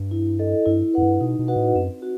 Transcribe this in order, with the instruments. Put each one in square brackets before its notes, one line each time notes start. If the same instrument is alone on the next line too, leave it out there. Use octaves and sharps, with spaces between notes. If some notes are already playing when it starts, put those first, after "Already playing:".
Already playing: [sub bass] G2
[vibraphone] E4
A4 D#5
[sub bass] G2 [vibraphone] E4
[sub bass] F#2 [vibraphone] B4 F#5
[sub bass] G2
[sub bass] B2 [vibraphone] D#4
[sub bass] B2
[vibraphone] F#4 B4 D#5 F#5
[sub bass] A2
[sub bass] F#2 [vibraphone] C4
[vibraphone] F#4